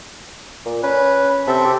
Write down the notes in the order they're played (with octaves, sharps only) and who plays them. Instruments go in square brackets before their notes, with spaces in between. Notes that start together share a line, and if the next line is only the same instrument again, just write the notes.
[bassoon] A#2
[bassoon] C#4 [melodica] B4
[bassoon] C3 [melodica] C4 A4 E5
[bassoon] G4